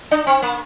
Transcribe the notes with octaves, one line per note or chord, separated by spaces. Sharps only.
D4
C4
A#3